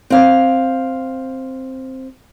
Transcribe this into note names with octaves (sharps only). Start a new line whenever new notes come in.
C4 F5